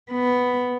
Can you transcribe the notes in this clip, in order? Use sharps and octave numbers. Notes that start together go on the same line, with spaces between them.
B3